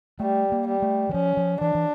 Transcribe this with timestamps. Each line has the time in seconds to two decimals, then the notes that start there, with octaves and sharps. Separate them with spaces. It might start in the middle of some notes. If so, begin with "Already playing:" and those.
0.20 G3 A3
0.52 A#3
0.67 G3
0.82 A3
1.09 E3
1.14 F3 C#4
1.37 F3
1.61 E3 D4
1.75 E3